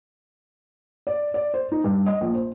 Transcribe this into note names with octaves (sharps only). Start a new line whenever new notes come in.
D5
D5
C5
D#4
G2
D#5
A#1
C5